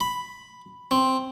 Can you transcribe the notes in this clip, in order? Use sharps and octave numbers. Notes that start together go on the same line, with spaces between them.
B5
C4